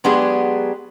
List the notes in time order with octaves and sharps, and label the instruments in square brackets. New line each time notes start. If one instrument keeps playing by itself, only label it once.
[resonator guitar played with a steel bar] F#3 G#3 B3 D4 G4 G#4